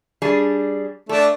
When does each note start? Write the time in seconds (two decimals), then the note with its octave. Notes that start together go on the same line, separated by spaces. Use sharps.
0.22 G3 D4 G#4
1.09 A3 D4 A4